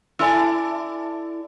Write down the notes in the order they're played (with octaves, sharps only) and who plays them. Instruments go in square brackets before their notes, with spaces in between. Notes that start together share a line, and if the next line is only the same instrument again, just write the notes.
[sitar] E4 A4 D5 [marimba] G#5 C6 E6